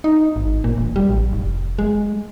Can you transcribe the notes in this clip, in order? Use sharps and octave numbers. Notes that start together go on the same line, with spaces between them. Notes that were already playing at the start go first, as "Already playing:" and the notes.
D#4
G#1
A#2
E1
G3
A1
F1
G#3